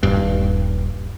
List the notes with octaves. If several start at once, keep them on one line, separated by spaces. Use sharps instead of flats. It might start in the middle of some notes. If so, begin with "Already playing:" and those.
D#1 G2